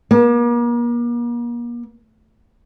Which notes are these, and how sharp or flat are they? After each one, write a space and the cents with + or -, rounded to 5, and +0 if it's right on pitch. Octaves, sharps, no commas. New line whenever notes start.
A#3 +40